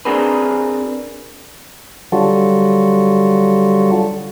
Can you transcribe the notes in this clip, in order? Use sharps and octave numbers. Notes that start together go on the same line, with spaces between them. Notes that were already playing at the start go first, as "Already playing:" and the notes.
C4 D4 F#4 G#4 A#4 B4
D3 F#3 G3 F4 F#4 A4